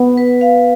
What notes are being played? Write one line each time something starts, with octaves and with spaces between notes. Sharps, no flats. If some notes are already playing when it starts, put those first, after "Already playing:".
Already playing: B3
B4
F5